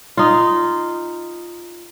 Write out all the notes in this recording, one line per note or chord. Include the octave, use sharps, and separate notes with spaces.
D#4 F4